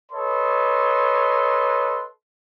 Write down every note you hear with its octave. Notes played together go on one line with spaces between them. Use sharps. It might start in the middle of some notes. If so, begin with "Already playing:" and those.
A4 B4 C#5 D#5 C6